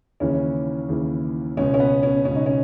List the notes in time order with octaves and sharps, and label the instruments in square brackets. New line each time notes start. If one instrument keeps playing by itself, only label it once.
[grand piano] D#2 C#3 E3 C#4
D#2 C#3 E3
C#2 B2 C#4
C#4
B3
C#4
C#2 B2 C#4
D#4
C#4